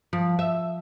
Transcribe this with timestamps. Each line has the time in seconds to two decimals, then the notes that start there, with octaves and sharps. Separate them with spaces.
0.13 F3
0.39 E5